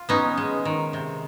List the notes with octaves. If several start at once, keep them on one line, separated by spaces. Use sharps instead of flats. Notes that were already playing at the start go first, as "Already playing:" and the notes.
Already playing: F4
B3 C#4 D#4
G#3
D#3
C3